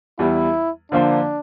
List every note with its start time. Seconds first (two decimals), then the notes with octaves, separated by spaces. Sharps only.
0.19 E2 E3 G3 E4
0.92 D3 F3 A#3 D4 F4 C5